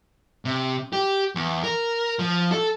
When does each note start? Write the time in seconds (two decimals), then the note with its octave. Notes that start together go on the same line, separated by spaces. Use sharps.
0.45 C3
0.93 G4
1.35 E2
1.64 A#4
2.19 F3
2.52 A4